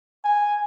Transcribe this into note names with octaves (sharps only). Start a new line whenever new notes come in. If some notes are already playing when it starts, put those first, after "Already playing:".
G#5